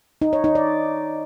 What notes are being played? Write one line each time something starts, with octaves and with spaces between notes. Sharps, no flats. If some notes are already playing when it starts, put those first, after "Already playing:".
D#4
C#5
D#4
D5